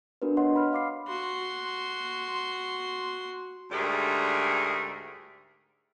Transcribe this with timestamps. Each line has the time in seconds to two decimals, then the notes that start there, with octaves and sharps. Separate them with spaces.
0.22 B3 D4 F#4 A#4 B4
0.37 C#5 D#5 F#5 C6
0.56 B5 F6
0.73 F5 D6 C7
1.08 F#4 C6
3.71 D2 G#2 G3 A3 G#4 A#4